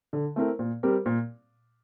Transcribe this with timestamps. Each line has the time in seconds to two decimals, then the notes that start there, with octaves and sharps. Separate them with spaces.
0.13 D3
0.36 A3 C4 E4 A#4
0.59 A#2
0.83 G3 C4 G4 A#4
1.06 A#2